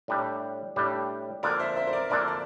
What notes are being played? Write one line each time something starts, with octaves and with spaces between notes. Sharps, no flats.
A2 G3 D4 G4
A2 G3 D4 G4
D3 F3 A#3 D4 A4 A#4 D5
C5 E5
C5 E5
C5
A#4 D5
D3 F3 A#3 D4 A4 A#4 D5
D5